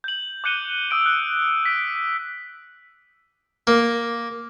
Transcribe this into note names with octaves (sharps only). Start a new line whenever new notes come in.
G6 F#7
D6 F#6 G6 C#7 D#7 G7
D#6 E6 D7
F#6
B6 D7
A#3